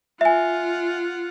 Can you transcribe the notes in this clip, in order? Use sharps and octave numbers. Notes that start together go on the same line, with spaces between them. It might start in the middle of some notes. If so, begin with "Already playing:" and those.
F4 E5 F#5 G#5